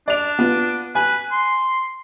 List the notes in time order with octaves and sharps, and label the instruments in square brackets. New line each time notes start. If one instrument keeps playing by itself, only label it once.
[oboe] D4 [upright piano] D5 F7
[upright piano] B3 F4
[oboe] B4 [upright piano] G#5
[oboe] C6